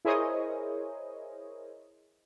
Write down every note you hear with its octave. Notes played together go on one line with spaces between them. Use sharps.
E4 G#4 A#4 C5 C#5 D#5